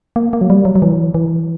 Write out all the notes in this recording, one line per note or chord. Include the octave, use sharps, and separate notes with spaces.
A#3
A#3
F#3
G3
F#3
F#3
E3
E3